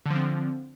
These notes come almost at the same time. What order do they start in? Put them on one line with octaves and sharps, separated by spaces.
D3 F3 C4